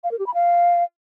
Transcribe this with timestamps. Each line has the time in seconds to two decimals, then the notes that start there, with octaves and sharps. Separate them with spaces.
0.04 F5
0.11 A#4
0.19 G4
0.26 B5
0.34 F5